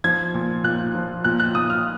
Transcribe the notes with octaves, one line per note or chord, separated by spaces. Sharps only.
F3 G#6
A#2
A#2 F#6
F3
A#2 F#6
F#6
A#2 D#6
F6